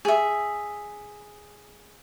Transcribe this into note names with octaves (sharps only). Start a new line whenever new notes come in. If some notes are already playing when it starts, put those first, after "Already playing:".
G#4 E5